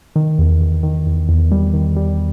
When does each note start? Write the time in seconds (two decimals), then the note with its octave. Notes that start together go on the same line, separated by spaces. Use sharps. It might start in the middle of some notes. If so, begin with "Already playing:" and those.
0.16 D#3
0.38 E2
0.61 E2
0.83 D#3
1.06 E2
1.29 E2
1.51 G3
1.74 D#3
1.96 G3